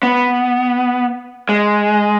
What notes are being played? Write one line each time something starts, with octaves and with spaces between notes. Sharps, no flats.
B3
G#3